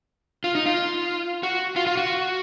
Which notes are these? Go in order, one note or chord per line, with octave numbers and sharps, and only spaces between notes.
F4
D#4
F4
F#4
F4
F4
F#4